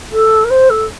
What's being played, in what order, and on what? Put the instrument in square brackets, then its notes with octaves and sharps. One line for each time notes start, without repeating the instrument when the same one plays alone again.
[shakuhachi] A4
A#4
C5
A4